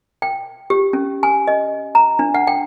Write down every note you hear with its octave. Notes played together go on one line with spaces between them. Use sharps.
G5
G4
C#4
G#5
D#5
A#5
D4
F#5
G5